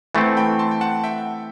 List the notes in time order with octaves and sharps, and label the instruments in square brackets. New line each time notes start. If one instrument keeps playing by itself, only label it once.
[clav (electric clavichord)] E3 A3 C4 [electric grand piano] F#5 A5
[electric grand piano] G5 B5
A5 C6
G5
F#5 A5
E5 G5